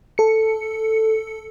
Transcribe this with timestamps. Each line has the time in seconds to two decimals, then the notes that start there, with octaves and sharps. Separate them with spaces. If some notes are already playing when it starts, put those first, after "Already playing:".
0.18 A4 C#7